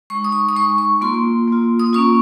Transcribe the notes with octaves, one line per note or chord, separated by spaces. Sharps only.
G#3 D#4 C#6
D#6
C#6
D#6
G#3 D#4 C#6
C#6
A#3 F4 C6
A#3 F4
D#6
A#3 C#4 F4 C#6